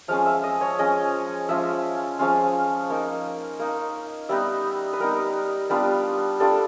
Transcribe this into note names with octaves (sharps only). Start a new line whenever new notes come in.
F3 G#3 C#4 F5
E5
D#5
C#5
F3 G#3 C#4 D#5
F3 G#3 C#4 F4 E5
F3 G#3 C#4 F4 F5
A#3 D#4
A#3 D#4
G3 B3 D#4 E5
B4
G3 B3 D#4 A#4
G3 B3 D4 F4
G3 B3 D4 F4 A4